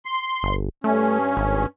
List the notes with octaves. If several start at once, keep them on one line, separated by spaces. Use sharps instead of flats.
C6
G1
G2 A3 C#4
G#1